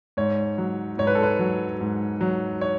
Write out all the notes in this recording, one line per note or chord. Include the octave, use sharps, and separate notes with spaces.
G#2 C#5
F#3
G#2 C#5
B4
A4
B4
F#3
G#2
F#3
C#5